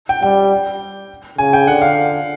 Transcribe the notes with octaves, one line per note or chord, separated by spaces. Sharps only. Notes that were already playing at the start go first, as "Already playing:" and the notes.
G5
G3 G5
C#3 G#5
G5
D3 F#5
F5